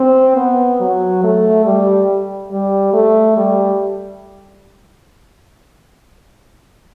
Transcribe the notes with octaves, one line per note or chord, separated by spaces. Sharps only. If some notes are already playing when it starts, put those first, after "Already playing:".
Already playing: C4
B3
F#3
A3
G3
G3
A3
G3